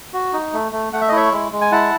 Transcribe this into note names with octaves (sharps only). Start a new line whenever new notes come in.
F#4
D#4
A3
A3
A3 F#5
E5
D#5
E4 C#5 E5
G#3
G#3
G#5
E4 F#5 A5